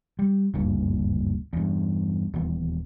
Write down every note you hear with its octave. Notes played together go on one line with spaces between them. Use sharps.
G3
F#1 D2 G2 A#2
E2 G2
D#1 E2